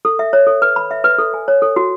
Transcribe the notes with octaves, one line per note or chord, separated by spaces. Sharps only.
A4
E5
C#5
A4
B4
B5
E5
B4
A4
G#5
C#5
A4
F#4